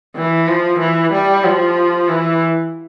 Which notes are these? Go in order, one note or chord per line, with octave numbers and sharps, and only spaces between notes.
E3
F3
E3
G3
F3
E3